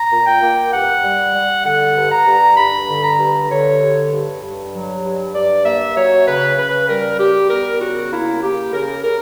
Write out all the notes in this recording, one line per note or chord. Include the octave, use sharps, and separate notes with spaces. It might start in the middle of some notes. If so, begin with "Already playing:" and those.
Already playing: A#5
A#2
G5
A#3
G2 F#5
G3
G3
D3 F#5
G2
A#5
G2
G2 B5
D3
A#5
G2
D3 C#5
G2
G2
G2
F#3
G2
G2 D5
A#3 E5
F#3 C#5
C#3 B4
C#3 B4
G3 A#4
G3 G4
B3 A#4
C#3 F#4
A#3 E4
A#3 G4
C#3 A#4
C#3 A#4